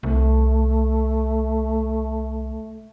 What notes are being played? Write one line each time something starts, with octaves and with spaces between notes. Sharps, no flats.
C2 A3